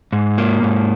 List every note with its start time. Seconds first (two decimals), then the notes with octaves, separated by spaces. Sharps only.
0.13 G#2
0.38 A#3
0.62 G#2